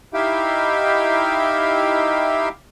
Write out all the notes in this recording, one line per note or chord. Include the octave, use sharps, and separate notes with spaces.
D#4 E4 G4 E5 F5 G5